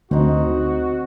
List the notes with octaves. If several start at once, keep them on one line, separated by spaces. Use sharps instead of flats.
D2 C4 D#4 F#4